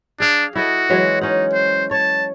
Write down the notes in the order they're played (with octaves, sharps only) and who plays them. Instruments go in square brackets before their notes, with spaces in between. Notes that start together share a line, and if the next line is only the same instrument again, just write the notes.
[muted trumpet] D4 [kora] G#4 F5
[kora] E4 A4 D#5 [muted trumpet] F#4
[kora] E3 F#3 G#3
[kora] C#4 F#5 [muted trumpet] D#4
[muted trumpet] C5
[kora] C#5 [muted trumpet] A5